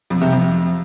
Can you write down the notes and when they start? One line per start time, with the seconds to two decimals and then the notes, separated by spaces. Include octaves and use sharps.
0.10 F2
0.21 C3
0.32 F2